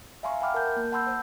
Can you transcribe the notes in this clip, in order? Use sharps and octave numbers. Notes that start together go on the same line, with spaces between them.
E5 F5 G#5 A#5 C6 C#6
E5 F#5 G5 B5 D6 F6
A#4 A5 G6
A#3
F#5 A5 B5 C6 E6 G6
C5 F#5